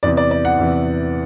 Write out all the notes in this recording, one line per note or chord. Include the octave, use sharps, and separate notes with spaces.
E2 C3 E3 D5
D5
D5
F#5
E2 C3 E3